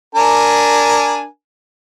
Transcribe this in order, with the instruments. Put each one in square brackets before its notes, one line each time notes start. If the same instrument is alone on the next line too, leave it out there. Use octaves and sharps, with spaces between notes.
[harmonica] D4 A#4 G#5